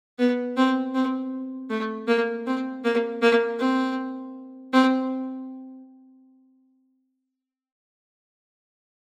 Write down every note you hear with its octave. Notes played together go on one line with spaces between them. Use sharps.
B3
C4
C4
A3
A#3
C4
A#3
A#3
C4
C4